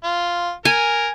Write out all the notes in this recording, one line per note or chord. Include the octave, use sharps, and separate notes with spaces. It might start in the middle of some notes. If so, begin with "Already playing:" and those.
F4
A#4 G#5